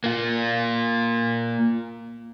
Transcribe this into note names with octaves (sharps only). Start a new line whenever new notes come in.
A#3 F4